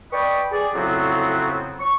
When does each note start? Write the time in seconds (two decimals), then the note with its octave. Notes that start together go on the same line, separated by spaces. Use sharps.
0.12 B4 D5 D#5 G5 B5 C#6
0.51 G#4 D5
0.74 F2 A2 C#3 F#3 B3 C4
1.79 C#6